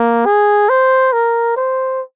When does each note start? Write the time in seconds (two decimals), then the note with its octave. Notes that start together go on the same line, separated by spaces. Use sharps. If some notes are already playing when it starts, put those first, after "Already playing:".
Already playing: A#3
0.26 G#4
0.69 C5
1.13 A#4
1.56 C5